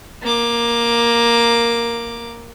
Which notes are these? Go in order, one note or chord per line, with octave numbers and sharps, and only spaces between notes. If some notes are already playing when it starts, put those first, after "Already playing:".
A#3 D6